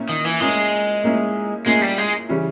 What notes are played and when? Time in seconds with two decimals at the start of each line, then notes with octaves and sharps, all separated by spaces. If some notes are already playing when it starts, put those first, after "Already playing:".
Already playing: A#2 A#3 C#4 E4
0.09 D#3
0.25 E3
0.40 A#2 G#3 A#3 C#4 E4
1.04 A#2 A#3 C#4 E4
1.66 A#2 G#3 A#3 C#4 E4
1.81 G3
1.98 G#3
2.29 C#3 E3 G3 C#4 E4